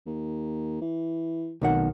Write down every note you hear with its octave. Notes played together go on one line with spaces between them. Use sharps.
D#2
E3
F1 B1 D#3 F#5